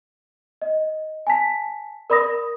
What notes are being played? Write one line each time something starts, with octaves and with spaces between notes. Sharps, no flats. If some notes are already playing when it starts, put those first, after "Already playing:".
D#5
G#5 A5 B6
A#4 D5 B5 D#6 A#6